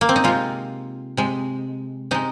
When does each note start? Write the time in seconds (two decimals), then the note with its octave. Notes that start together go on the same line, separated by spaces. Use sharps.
0.01 A#3
0.09 C4
0.16 D#4
0.24 C3 G#3 F4
1.17 C3 G#3
2.11 C3 G#3 D#4